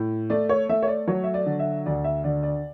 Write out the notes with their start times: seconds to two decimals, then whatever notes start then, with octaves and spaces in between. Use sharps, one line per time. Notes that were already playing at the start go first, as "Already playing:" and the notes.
Already playing: A2
0.30 A3 D5
0.49 C#5
0.69 A3 E5
0.82 C#5
0.88 D5
1.07 F#3 C#5
1.24 E5
1.34 D5
1.46 D3
1.59 E5
1.86 D2 D5
2.04 E5
2.24 D3 D5
2.43 D5